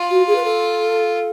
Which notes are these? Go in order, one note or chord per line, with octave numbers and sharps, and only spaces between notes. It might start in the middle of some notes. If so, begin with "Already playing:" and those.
Already playing: F4
F#4
G#4
B4
A4